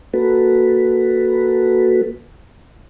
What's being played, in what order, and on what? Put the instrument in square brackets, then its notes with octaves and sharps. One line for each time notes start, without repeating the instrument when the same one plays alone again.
[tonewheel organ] A#3 F#4 A4 B4